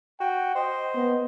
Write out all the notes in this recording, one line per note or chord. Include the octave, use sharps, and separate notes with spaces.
F#4 G5
C5 D#5
B3